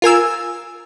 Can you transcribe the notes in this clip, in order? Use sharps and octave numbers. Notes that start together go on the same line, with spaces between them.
F4 A#4 G#5 E6